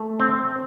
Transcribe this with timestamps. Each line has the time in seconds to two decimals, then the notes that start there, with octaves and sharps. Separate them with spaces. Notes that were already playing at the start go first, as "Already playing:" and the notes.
Already playing: A3
0.20 C4